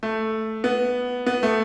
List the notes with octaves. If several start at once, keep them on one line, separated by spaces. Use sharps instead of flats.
A3
B3
B3
A3